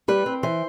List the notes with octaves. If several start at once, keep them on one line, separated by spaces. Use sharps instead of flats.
G3 B4
C4
E3 C5